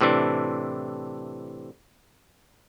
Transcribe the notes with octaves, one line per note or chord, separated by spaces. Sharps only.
A2 C3 E3 D4